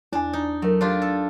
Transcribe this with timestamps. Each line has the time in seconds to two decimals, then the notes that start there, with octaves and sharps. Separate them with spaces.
0.13 E2 D4 G#5
0.33 D#4
0.62 F#3 A3 A#4
0.81 D4 F4 G4
1.02 A4